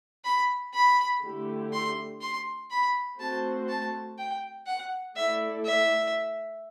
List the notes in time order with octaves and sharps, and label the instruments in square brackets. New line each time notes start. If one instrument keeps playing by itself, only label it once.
[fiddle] B5
B5
[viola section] D3 A3 E4 G4
[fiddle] C6
C6
B5
[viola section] A3 C4 F#4 C5 [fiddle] A5
[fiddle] A5
G5
F#5
[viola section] A3 E4 A4 D5 [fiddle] E5
[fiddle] E5